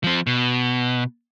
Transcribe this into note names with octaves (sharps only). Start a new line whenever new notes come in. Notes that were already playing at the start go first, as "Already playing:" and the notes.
F3 C4
B2